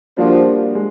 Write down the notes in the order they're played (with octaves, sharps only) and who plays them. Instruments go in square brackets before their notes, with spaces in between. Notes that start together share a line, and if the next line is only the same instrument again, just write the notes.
[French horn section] F3 [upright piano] G3 A#3 D4 F#4
[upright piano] G#3